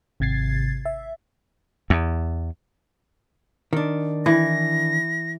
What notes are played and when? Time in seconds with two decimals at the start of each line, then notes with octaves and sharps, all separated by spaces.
0.20 G#1 C3 G#6 A6 C7
0.85 E5
1.90 E2
3.73 D#3 D4
4.26 E3 A#6